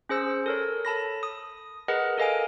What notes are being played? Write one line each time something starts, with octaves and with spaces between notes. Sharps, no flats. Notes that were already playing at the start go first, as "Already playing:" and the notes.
C#4 G#4 C5 E6
A4 A#4 C#5
A4 A5 B5 A#6
D#6
G#4 A#4 B4 D#5 F#5
A4 A#4 D#5 F5 G#5 D7